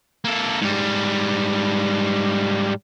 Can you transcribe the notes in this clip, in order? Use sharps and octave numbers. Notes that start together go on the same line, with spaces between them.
A#3 A4
G#2 G3